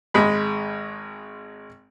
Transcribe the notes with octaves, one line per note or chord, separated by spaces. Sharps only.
G#1 G#3 B5